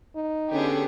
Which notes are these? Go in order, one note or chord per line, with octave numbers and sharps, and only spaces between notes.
D#4
D3 B3 C#4 G4 G#4